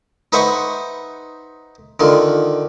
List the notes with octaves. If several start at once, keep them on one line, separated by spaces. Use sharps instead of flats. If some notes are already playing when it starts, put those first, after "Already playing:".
D#4 B4 C5 E5 F#5 C#6
D3 D#3 F4